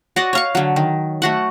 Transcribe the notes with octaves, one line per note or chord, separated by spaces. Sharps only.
F#4 D5 D#5
C#5 F5 C#6
D3 F#3
D#3
A3 F#4 F#5